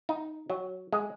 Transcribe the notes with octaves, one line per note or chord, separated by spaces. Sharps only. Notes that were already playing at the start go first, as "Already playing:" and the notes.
D#4
F#3
G#3